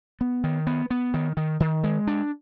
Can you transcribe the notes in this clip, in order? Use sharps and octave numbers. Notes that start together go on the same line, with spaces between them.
B3
D#3
B3
B3
D#3
D#3
D#3
G#3
D4